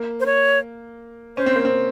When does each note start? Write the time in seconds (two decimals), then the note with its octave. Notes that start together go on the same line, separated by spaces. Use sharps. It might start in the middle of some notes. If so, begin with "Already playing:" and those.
Already playing: A#3
0.20 C5
0.26 C#5
1.37 C#4 C5
1.46 C4
1.56 A#3
1.65 C4